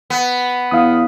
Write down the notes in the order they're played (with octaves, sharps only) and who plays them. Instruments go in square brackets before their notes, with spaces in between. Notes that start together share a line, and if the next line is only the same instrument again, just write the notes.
[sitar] B3
[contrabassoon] E2 [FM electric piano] F5 D#6